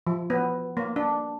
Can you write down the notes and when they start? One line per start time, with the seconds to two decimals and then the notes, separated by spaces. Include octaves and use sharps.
0.07 F3
0.30 B3
0.77 A#3
0.96 D4